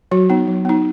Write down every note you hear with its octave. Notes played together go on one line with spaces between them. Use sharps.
F#3 F#4
B3 D#4
F#3
B3 D#4